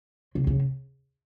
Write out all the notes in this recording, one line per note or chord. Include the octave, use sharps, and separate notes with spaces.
C#3
C#3